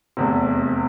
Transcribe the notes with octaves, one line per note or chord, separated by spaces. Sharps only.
F1 E2 C3